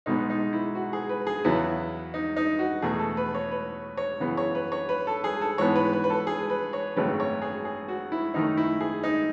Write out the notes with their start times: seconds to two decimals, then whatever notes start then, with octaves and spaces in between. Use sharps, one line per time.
0.06 B1 B2 G#3 B3 D#4
0.30 D#4
0.53 E4
0.75 F#4
0.93 G#4
1.09 B4
1.27 G#4
1.44 E2 C#3 F#3 B3 E4
2.14 D#4
2.36 D#4
2.59 F#4
2.82 E2 B2 A3 G#4
2.99 A4
3.17 B4
3.34 C#5
3.51 B4
3.97 C#5
4.20 F#2 C#3 E3 B3
4.37 C#5
4.55 B4
4.72 C#5
4.89 B4
5.07 A4
5.24 G#4
5.41 A4
5.58 G#2 E3 B3 C#5
5.76 B4
5.93 B4
6.04 B4
6.10 A4
6.27 G#4
6.50 B4
6.73 C#5
6.96 G#1 F#2 C#3 F#3 A3 B4
7.20 C#5
7.42 G#4
7.65 G#4
7.88 F#4
8.12 E4
8.34 F#2 D#3 A3 D#4
8.57 E4
8.80 G#4
9.03 D#4